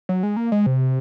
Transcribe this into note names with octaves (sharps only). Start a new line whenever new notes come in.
F#3
G#3
A#3
G#3
C3